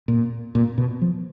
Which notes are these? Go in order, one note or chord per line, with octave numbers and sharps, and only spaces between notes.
A#2
A#2
B2
F3